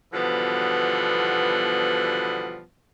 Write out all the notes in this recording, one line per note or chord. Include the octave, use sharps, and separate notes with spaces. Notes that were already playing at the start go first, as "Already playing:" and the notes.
B2 D3 E3 F3 G3 B3